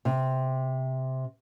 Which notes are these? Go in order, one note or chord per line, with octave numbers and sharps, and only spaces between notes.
C3